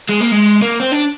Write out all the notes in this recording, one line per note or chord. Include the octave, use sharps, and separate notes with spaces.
G#3
A#3
G#3
A#3
C4
D4